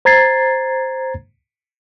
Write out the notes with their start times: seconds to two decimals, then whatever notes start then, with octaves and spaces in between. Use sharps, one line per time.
0.05 C5 A#5 G#6 A6 C7